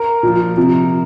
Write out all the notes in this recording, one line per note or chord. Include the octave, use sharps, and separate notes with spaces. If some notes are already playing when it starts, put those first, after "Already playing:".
Already playing: A#4
A#2 F3
C3 F3